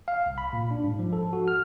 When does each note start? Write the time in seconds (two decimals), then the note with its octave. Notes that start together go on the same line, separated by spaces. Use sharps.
0.08 F5
0.26 C2
0.38 B5
0.53 A#2
0.71 D4
0.84 G#2
0.99 F3
1.13 A4
1.33 F#4
1.48 F6